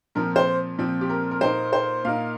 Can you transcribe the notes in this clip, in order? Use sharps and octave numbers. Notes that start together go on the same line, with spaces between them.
A#2 F3 C4 A#4
C5
A#2 F3 C4
G4
A#4
A#4
A#2 A#3 D#4 C5
C5
A#2 A#3 D#4 F5